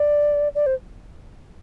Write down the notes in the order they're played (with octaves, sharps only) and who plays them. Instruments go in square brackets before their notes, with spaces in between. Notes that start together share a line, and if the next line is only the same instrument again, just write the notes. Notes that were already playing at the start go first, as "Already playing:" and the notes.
Already playing: [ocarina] D5
D5
C5